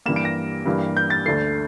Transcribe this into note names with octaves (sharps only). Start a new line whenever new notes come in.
G2 E3 G3 A#3 E7
D7
A#6
G2 E3 G3 A#3
G6
A6
D2 D3 A3 C7